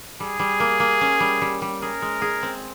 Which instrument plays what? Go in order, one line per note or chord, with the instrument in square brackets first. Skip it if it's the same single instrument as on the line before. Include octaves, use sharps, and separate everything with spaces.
[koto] G3 [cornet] G#4
[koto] G3
A#3
A#3
C#4
G3
G3
G3
[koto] G#4 [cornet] A#4
[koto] G#3
G#4
C4